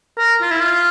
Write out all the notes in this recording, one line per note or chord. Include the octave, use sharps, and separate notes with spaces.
A#4
F4
E4
F4